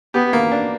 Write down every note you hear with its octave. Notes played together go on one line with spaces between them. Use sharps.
B3 G4
A#3
D4